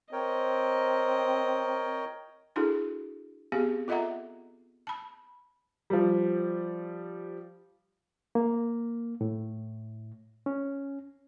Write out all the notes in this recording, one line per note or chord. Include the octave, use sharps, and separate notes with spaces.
C4 A#4 C#5 D#5 G5
D4 E4 F#4 G#4 A4
B3 C4 G4 G#4 F5
F4 A4 D#5 E5 F#5 A#5
A5 B5
F3 G3
A#3
A2
C#4